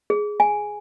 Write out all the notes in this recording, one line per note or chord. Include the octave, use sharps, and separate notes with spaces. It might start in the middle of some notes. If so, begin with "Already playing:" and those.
G#4
G#5